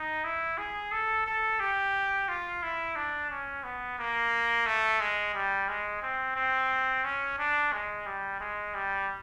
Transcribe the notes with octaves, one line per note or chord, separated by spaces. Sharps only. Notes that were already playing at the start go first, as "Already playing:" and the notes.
Already playing: D#4
E4
G#4
A4
A4
G4
F4
E4
D4
C#4
B3
A#3
A3
G#3
G3
G#3
C4
C4
C#4
D4
G#3
G3
G#3
G3